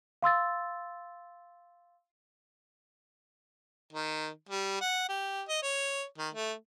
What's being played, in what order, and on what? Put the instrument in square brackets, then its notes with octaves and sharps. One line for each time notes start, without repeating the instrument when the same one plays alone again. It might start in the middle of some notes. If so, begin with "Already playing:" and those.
[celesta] F5 C6 E6 A6
[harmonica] D#3
G3
F#5
G4
D#5
C#5
D#3
A3